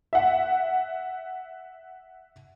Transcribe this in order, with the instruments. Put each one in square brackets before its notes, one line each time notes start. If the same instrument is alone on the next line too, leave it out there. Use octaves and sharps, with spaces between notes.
[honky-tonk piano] E5 F#5